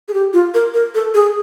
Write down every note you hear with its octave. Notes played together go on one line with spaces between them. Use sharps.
G#4
G4
F4
A#4
A#4
A4
G#4